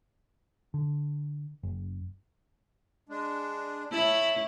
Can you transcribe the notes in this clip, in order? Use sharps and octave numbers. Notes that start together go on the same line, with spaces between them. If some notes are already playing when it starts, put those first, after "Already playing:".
D3
F#1
G#3 D4
E4 C#5 A5 B5 E6